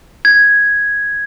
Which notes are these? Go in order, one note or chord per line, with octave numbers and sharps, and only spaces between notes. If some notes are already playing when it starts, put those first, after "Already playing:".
G#6